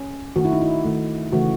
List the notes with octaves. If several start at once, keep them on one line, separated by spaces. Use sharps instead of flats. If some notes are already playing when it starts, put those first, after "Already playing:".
Already playing: C#4
D#3 A3 F#4
E4
D#4
E4
D#3 A3
C#3 E3 A3 F#4